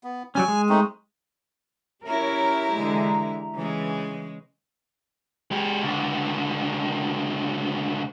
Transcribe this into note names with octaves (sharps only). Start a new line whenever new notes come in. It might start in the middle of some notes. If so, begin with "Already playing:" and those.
B3
F#3 G3 C#4 G#5
G#3
A3 C4 D#4
C#4 E4 G4 A#4 C#5 E5 A#5
D3 E3 G#3
C#3 E3 G#3
G#3 G4
C#2 D3